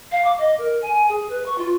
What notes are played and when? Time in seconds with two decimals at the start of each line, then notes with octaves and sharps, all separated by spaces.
0.11 F5
0.24 D6
0.38 D#5
0.58 A#4
0.82 G#5
1.09 G#4
1.30 B4
1.46 C#6
1.58 F4